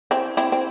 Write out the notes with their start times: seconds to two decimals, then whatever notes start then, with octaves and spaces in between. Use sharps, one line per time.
0.11 C4 E4
0.37 C4 E4
0.52 C4